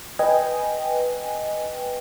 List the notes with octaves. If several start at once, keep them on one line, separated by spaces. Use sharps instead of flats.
B4 D#5 G5 G#5